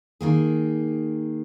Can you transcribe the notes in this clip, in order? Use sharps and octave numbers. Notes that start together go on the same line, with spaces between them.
D#3 A#3 G#4